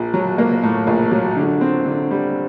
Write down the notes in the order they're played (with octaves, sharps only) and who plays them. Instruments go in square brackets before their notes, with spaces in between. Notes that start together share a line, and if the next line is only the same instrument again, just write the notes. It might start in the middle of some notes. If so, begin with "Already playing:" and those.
Already playing: [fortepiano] A#1
F#3
A#3
A2
A#1
F#3
D3
C4
D3
G3